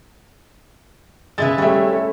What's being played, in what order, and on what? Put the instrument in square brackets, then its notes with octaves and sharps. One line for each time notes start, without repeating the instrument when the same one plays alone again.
[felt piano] C#3 E5 A6 [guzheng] G#3 E4 B4
[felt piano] G3 E5 [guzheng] A3 C#4
[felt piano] A4